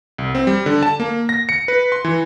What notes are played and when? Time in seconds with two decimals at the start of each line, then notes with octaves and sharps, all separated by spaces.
0.18 C2
0.35 C4
0.47 G3
0.66 D3
0.83 A5
1.00 A#3
1.29 A#6
1.49 C#7
1.68 B4
1.92 C6
2.05 E3